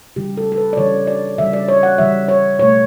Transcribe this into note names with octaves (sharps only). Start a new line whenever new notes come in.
C#3 E3 G3 G4
A4
A4
B4
D5
C#3 E3 G3 C#5
D5
C#3 E3 G3 E5
D5
C#5
F#5
C#3 E3 G3 E5
C#5
B2 A3 C#5